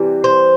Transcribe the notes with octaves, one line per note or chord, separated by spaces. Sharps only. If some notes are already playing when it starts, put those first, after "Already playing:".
Already playing: C3 E3 G3
C5